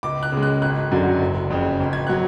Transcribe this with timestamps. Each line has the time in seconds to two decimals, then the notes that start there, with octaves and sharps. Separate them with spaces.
0.03 C#2 D6
0.23 F#6
0.32 C#3 G#3
0.43 F#6
0.62 G#1 F#6
0.91 F#2 D3 F#3
1.21 F#1
1.50 F2 C#3
1.80 G#1
1.93 G#6
2.07 F#3 F#6